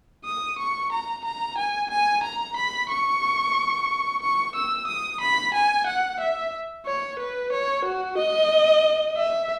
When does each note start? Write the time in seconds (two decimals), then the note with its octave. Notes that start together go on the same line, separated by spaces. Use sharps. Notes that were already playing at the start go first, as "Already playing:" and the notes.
0.25 D#6
0.58 C#6
0.92 A#5
1.25 A#5
1.58 G#5
1.90 G#5
2.23 A#5
2.56 B5
2.90 C#6
4.22 C#6
4.55 E6
4.87 D#6
5.20 B5
5.54 G#5
5.86 F#5
6.20 E5
6.86 C#5
7.19 B4
7.52 C#5
7.85 F#4
8.18 D#5
9.17 E5